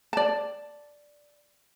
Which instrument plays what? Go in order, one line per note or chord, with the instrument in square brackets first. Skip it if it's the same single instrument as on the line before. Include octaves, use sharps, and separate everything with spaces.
[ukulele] D5 A5